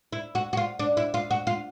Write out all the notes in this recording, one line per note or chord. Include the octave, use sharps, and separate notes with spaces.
E4
F#4
F#4
F4
D4
E4
F4
F#4
F4